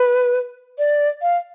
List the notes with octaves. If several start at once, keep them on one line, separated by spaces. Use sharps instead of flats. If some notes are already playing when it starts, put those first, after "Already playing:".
Already playing: B4
D5
F5